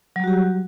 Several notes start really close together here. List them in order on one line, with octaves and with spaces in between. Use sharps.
F#3 G3 F#4 G4